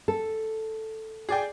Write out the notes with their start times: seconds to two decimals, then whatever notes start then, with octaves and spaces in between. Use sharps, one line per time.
0.08 A4
1.29 G#4 D5 G5